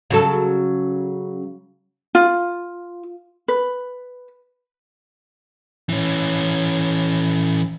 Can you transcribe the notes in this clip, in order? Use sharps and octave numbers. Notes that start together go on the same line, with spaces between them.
C#3 F#3 A4
F4
B4
E3 C#4